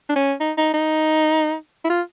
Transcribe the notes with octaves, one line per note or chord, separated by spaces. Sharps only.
D4
C#4
D#4
D#4
D#4
E4
F4